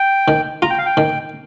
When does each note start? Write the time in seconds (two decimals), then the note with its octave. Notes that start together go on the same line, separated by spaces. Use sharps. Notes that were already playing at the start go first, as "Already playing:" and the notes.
Already playing: G5
0.28 D#3
0.62 F4 A#5
0.70 G5
0.78 F5
0.86 G5
0.97 D#3